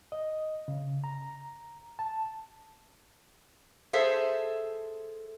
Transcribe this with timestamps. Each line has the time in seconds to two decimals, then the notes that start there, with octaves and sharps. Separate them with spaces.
0.12 D#5
0.68 C#3
1.04 A#5
1.99 A5
3.93 G#4 A4 C5 E5